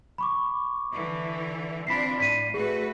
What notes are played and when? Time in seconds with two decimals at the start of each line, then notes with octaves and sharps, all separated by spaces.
0.18 B5 C#6 D6
0.91 D3 E3
1.87 C4 D4 F4 B5 B6 C7
2.18 A2 D5 B6 D#7
2.54 A3 F#4 G#4 B4